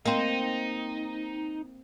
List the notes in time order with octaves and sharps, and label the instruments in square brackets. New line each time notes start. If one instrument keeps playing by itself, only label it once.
[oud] A#3 C4 [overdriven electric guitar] D#4